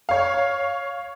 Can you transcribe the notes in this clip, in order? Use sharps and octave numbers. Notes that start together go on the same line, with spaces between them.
C#5 F5